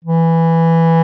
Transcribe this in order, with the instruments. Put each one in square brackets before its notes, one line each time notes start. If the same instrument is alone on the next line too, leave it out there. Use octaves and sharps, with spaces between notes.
[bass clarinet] E3